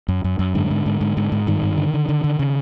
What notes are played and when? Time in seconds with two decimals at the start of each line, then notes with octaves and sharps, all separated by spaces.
0.08 F#2
0.24 F#2
0.39 F#2
0.55 G#2 D3
0.71 G#2
0.86 G#2
1.01 G#2
1.17 G#2
1.32 G#2
1.47 G2 D#3
1.62 G2
1.77 D3
1.94 D3
2.09 D3
2.24 D3
2.39 C#3